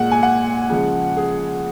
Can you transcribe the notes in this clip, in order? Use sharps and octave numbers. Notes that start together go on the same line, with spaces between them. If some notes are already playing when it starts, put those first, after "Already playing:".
Already playing: A#2 G#3 F#5
G#5
F#5
C#3 F3 G#3
G#4